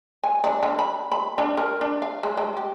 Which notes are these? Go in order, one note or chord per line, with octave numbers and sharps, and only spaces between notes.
G#5
D4
D3
B5
B5
D4
A#4
D4
F5
G#3
G#3
G4